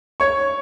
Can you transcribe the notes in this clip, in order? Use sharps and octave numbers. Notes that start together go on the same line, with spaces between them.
C#5 C#6